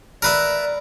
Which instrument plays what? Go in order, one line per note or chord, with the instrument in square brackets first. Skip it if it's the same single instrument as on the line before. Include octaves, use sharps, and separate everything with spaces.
[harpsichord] A#4 B4 E5 [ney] D5